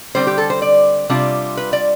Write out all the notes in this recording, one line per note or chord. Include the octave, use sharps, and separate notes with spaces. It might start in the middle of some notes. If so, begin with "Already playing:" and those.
D3 G3 C4 C5
G4
A4
C5
D5
C3 G3 D4 F4
B4
D5